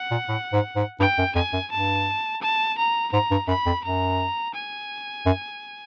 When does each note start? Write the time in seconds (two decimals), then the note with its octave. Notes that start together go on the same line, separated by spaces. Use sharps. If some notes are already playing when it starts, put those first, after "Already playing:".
Already playing: F#5
0.11 A#2
0.29 A2
0.53 G#2
0.76 G#2
1.00 G2 G5
1.18 F#2
1.35 F2 G#5
1.53 F#2
1.72 G2 A5
2.42 A5
2.78 A#5
3.12 G#2 A#5
3.31 G2
3.48 F#2 B5
3.66 F2
3.84 F#2 A#5
4.55 G#5
5.26 F#2